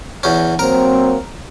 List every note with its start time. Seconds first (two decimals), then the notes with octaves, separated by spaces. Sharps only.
0.23 E2 C#4
0.59 F#3 A#3 C4 A#4